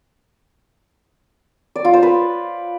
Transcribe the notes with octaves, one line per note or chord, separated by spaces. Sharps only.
D5
F4
C5
B4